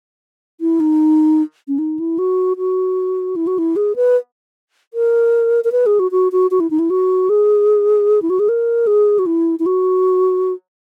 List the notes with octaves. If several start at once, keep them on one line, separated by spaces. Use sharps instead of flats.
E4
D#4
C#4
D#4
E4
F#4
F#4
E4
F#4
E4
G#4
B4
A#4
A#4
B4
G#4
F#4
F#4
F#4
F#4
E4
D#4
E4
F#4
G#4
E4
F#4
G#4
A#4
G#4
F#4
E4
E4
F#4